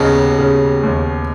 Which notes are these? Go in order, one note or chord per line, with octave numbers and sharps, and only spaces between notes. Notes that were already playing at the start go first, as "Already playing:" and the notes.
Already playing: D#2 C#3 B3 D#4
C#3
D#2